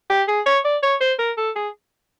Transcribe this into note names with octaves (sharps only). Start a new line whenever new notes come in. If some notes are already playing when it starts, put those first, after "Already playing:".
G4
G#4
C#5
D5
C#5
C5
A#4
A4
G#4